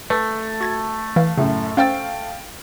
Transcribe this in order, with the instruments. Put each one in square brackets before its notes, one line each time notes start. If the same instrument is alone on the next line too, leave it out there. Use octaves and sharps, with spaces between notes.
[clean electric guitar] A3 [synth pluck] B4
[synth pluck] F#4 G#6 A6
[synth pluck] E3 [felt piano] F5
[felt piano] F#2 A2 [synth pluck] C#3
[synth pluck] C#4 C5 E6 [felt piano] F5 G5 A6